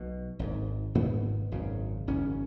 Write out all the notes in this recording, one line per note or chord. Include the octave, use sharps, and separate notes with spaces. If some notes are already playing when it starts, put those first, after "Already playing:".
Already playing: B1 B2
G#1 G#2
G#1 G#2 B3
G#1 F#2 C#3
G#1 F#2 C#3 C#4